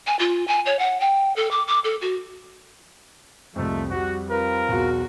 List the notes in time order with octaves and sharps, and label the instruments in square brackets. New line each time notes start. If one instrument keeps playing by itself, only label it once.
[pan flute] G#5
F4
G#5
C#5
F#5
G5
A4
D6
D6
A4
F#4
[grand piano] C2 F2 [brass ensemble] F3 G#3 A3
[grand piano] F2 G3 [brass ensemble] F#4
[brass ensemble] C4 F4 A#4 [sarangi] B4
[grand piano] B1 E2 [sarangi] F#4